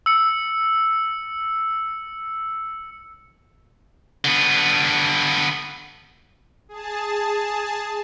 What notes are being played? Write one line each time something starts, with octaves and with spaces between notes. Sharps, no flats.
E6 C#7
D3 B3
G#4 A5